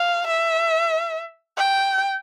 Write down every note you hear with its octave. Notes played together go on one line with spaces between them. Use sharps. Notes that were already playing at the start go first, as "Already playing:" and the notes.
Already playing: F5
E5
G5